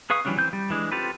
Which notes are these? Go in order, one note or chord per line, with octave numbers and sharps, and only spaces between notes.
G#4 B4 F5 C#6 D#6
E3 F#3 G3 C#4 D4
E3 C4 G6
G3
E3 G#3 D4
C4 F4 G4 A4 B4